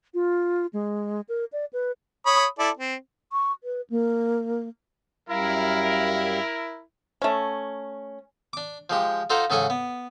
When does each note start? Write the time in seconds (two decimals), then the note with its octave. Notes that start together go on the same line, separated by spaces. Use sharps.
0.14 F4
0.73 G#3
1.29 A#4
1.53 D5
1.73 B4
2.26 C#5 B5 D#6
2.58 E4 A4 D5
2.77 C4
3.32 C#6
3.64 B4
3.90 A#3
5.29 F#2 G3 E4 A#4 F5
7.22 A3 C#4
8.53 D4 D6
8.90 F3 G#3 G4
9.30 D#4 F4 A4 C5 F#5 A#5
9.50 G#2 C#3 G#4 A4 F#5 G#5
9.70 B3